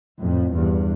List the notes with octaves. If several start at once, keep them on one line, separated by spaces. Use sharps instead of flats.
F2 A2
E2 G2